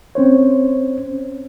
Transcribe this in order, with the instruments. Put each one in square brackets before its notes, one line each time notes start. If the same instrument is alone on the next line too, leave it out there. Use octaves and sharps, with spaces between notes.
[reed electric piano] C4 C#4 C5 C#5